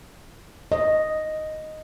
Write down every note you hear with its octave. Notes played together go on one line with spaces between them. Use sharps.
D#5